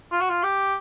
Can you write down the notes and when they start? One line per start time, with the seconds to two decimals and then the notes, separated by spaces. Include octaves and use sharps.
0.12 F4
0.21 F#4
0.29 F4
0.43 G4